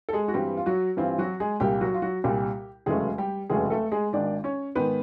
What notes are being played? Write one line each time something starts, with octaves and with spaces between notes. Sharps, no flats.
A4
G#3 G#4
F#4
G2 E3 G3 C4 G4
F4
F#3 F#4
G2 E3 G3 C4 F4
F#3 F#4
G#3 G#4
C2 A#2 G3 A#3 G4
F#3 F#4
F4
F#3 F#4
C2 A#2 G3 A#3 G4
F1 E2 C#3 F#3 G#3 A3 G#4
G3 G4
F1 E2 C#3 F#3 G#3 A3 G#4
A3 A4
G#3 G#4
G#1 G#2 D#3 D4 D5
C#4 C#5
G#2 D#3 B3 B4